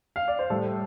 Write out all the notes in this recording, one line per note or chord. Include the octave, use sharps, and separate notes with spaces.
F5
D5
C5
A2 G3 A4